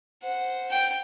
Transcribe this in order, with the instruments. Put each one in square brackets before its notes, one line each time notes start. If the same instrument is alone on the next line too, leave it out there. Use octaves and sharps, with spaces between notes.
[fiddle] C5 F#5
[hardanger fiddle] G5